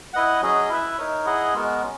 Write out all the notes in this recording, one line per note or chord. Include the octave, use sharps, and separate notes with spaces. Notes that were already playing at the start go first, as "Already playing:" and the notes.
E4 B4 D#5 F#5
F#3 C#4 G#4 D#5
E4 B4 E5
D#4 A#4 C#5
E4 G#4 D#5 F#5
G#3 B3 F#4 A#4
C#4